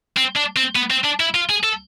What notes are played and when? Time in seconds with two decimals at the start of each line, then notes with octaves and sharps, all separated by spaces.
0.17 C4
0.36 D4
0.57 C4
0.76 B3
0.91 C4
1.05 D4
1.20 E4
1.35 F4
1.50 G#4
1.63 A4